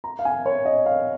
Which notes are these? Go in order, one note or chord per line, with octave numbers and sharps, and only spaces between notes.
A#5
F5
G#5
C#5
D#5
F5